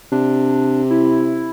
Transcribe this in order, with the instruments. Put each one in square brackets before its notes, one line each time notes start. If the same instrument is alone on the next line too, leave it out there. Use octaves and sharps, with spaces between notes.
[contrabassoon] C3 [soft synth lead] D4
[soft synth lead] E4